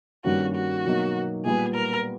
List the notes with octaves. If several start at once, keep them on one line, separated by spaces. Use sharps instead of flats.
G2 D#3 G3 A#3 C#4 F#4
F#4
B2 F#3 A#3 D#4
A#2 G3 B3 G#4
A#4